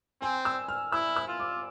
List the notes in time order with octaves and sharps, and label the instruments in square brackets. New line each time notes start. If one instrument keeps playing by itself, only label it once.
[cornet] C4 [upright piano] G#5
[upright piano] E6
F6
[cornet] E4 [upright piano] E6
[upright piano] E6
[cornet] F4
[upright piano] D6